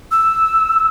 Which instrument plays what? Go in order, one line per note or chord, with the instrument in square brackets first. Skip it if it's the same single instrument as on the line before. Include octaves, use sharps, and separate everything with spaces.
[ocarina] E6